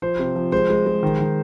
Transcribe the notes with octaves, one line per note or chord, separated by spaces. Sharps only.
F3 C5
C3
F3
G#3 C5
G#3
G#3
D#3
D#3